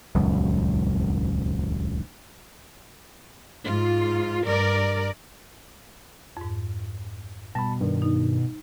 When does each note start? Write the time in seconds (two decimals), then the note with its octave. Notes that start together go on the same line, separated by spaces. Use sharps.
0.15 D#1 C#2 F#2
3.63 G#2 F4
4.44 G2 A#4 D5
6.37 F2 G#2
7.55 B2 G3 A5 B5
7.81 G2 D#3
8.02 D#4